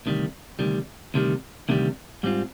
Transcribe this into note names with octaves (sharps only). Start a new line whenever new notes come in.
D2 C3 D#3 G3
D2 C3 D#3 G3
D2 C3 D#3 G3
D2 C3 D#3 G3
G#2 G3 C4 F4